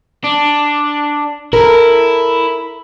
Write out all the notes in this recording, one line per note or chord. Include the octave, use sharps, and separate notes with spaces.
D4
E4 A4 A#4